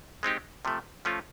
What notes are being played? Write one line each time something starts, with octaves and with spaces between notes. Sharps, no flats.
G#3 C4 D#4 G4
C3 F3 A3
F3 A3 C#4 F4